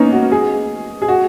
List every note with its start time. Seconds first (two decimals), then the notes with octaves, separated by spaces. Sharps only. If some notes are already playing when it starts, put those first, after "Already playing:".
Already playing: A#3 B3 C#4 D#4
0.13 F#4
0.32 G#4
1.02 G#4
1.08 F#4